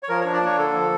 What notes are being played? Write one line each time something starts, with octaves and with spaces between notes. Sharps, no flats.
C#5
F3 A#4
D4 C#5
D5
A#3 C#5
D3 A4
F3